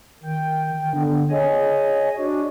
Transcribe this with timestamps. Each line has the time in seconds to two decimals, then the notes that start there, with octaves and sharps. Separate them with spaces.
0.23 D#3 G5
0.93 D3 B3
1.31 G#4 C#5 D#5 G#5
2.18 D4 F#4